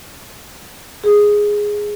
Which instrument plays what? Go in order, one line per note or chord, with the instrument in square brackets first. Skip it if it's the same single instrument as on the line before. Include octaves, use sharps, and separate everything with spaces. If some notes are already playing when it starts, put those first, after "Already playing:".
[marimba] G#4